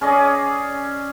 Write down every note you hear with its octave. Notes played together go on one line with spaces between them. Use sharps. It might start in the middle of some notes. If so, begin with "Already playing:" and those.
C#4 G#4 D5 D#5